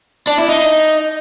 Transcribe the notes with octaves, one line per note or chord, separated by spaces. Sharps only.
D4
E4
D#4